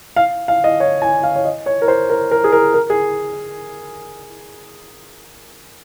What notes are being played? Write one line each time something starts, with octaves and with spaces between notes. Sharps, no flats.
F5
F5
D#5
C#5
G#5
F5
C#5
D#5
C#5
A#4
C5
A#4
A#4
G#4
A#4
A#4
G#4